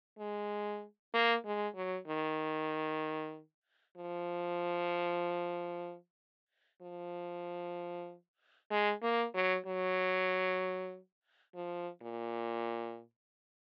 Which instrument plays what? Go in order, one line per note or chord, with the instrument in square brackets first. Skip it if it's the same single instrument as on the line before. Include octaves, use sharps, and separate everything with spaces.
[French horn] G#3
A#3
G#3
F#3
D#3
F3
F3
G#3
A#3
F#3
F#3
F3
A#2